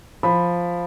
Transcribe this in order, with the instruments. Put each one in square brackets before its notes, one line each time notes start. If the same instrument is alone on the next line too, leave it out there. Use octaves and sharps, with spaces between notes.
[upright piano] F3 B5